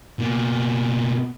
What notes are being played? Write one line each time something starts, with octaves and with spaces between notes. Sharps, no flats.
B2 A#3